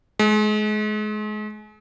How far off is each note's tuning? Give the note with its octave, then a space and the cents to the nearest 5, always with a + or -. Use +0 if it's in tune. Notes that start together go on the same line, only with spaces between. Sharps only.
G#3 +35